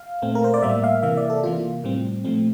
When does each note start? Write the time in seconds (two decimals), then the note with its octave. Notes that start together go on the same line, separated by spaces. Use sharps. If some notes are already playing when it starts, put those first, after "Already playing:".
Already playing: F5
0.22 A#2 A3 C4
0.35 A#4
0.44 C5
0.54 D5
0.62 A2 G3 A#3 E5
0.84 F5
1.03 C3 E3 A#3 E5
1.17 D5
1.30 A4
1.43 C3 E3 A#3 F4
1.84 A2 G3 C4
2.24 A#2 F3 A3 C4